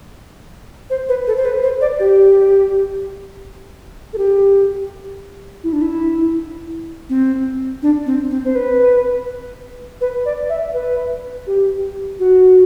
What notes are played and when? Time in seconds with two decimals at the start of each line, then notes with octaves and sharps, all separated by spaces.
0.90 C5
1.09 B4
1.27 A4
1.36 C5
1.45 B4
1.63 C5
1.81 D5
2.00 G4
4.13 A4
4.18 G4
5.64 E4
5.73 D4
5.81 E4
7.09 C4
7.82 D4
8.06 C4
8.31 C4
8.45 C5
8.55 B4
10.01 B4
10.25 D5
10.49 E5
10.74 B4
11.47 G4
12.19 F#4